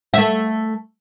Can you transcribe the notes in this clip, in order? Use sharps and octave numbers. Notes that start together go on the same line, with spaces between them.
A3 E5